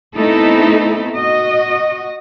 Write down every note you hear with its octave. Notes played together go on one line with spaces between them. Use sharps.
A3 B3 C4 D#4 E4 A4
F#4 D#5